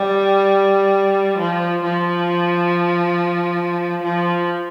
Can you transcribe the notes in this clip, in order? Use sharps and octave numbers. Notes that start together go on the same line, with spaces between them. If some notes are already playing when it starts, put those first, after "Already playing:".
Already playing: G3
F3
F3
F3